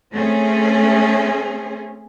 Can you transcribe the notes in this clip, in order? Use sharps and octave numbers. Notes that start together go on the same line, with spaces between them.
A3 C4 C#4 G#4